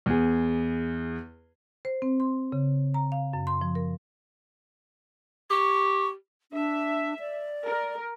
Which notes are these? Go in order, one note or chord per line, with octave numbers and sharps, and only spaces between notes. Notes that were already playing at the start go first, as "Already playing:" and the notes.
E2 G#4
C5
C4
C6
C#3
A#5
F5
F#2
C6
F3
A#4
G4 C#6
D4 E5
D5
A#4